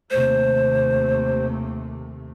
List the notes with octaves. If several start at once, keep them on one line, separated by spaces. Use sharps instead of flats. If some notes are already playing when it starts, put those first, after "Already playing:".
D#2 C3 A3 C5